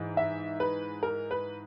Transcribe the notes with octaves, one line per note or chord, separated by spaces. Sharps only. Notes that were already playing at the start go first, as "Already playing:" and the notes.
Already playing: G#2 E3
E5
B4
A#4
B4